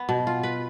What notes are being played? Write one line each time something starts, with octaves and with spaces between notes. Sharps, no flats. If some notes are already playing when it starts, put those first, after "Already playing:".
Already playing: B3
B2
F4
B4